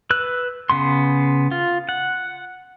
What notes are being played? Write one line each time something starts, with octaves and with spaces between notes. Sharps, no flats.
B4 E6 F#6
C#3 B3 C6
F4
F#5